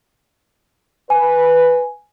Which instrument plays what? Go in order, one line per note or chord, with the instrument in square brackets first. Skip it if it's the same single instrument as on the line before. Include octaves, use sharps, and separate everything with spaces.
[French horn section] B4 [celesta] G#5